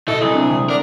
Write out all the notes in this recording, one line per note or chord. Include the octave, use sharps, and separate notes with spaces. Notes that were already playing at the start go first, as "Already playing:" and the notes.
B2 E4 A4 D#5 E5
C2 F#3 G#4
C4 D4
D3 E3 G#3
D4 A#4